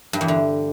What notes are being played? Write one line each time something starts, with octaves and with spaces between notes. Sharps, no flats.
G2
E2
D3